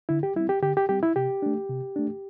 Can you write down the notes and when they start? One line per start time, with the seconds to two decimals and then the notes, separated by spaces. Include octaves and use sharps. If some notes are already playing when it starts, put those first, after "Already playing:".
0.09 D3 E4
0.23 G4
0.36 G3 C4 E4
0.49 G4
0.62 D3 G4
0.77 G4
0.89 G3 C4 G4
1.03 E4
1.16 C3 G4
1.42 A3 D4
1.70 C3
1.96 A3 D4